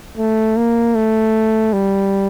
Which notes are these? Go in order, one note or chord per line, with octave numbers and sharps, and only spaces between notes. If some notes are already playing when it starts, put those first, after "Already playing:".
A3
A#3
A3
G3